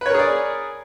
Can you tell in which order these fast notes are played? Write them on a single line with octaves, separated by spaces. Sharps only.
B4 C#5 A#4 G#4 D5